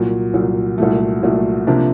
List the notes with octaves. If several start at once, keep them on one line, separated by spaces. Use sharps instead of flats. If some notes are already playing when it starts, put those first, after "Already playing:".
Already playing: C2 A#2 F#3
C2 A#2 F#3
C2 A#2 F#3 A3
C2 A#2 F#3 A3
C3 F3 A#3 D4 G4